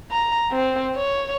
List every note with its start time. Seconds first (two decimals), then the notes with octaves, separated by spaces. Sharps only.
0.11 A#5
0.52 C4
0.95 C#5